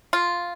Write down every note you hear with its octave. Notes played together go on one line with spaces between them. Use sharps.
F4